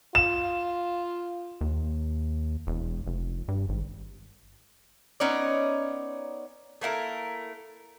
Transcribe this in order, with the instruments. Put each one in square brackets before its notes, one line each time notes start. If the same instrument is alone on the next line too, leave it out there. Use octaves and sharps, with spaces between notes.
[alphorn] F4 [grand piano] E7
[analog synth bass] D#2
E1
F1
G2
G#1
[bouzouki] B3 C#4 D#4 D5
A3 A#3 E4 A#4